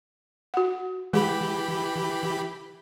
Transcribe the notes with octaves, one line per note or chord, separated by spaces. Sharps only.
F#4 F#5
E3 G#3 G4 G#4 B5